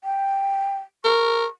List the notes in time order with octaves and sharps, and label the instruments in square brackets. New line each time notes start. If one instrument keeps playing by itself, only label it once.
[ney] G5
[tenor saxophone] A#4 [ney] C#6